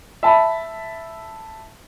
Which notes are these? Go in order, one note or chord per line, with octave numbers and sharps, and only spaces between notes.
E5 A5 B5